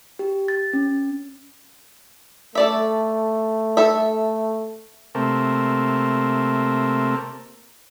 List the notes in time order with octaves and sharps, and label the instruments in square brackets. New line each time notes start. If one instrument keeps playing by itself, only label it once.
[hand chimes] G4
A6
C#4
[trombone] A3 [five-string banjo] A4 D5 E5
[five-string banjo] A4 E5
[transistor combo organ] C3 A3 A#3